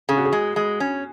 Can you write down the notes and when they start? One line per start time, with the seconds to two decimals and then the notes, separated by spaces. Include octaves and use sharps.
0.09 C#3 G#4
0.17 F#4
0.25 G#4
0.33 G#3
0.56 G#3
0.80 C#4